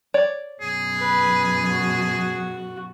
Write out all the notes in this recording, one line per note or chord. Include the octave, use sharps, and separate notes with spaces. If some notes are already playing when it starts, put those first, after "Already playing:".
C#5 D5
F#2 B2 G#4
B4
F#4